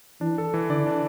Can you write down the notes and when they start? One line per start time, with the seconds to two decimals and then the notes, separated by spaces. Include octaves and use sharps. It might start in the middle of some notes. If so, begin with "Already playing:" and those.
0.21 E3 D4
0.38 A4
0.54 E3
0.69 D3 D5
0.86 D4